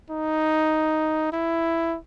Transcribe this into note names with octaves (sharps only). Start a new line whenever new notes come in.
D#4
E4